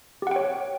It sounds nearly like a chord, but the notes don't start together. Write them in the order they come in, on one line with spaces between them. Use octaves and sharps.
G4 F#5 G5 C#5